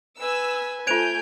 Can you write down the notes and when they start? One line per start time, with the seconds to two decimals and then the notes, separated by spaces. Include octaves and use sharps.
0.20 B4 G#5 E6
0.87 A3 F4 C5 G#5 G6 G#6 D7 F7